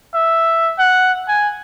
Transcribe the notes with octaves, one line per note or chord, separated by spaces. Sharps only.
E5
F#5
G#5